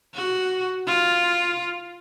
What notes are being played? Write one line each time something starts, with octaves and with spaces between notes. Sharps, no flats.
F#4
F4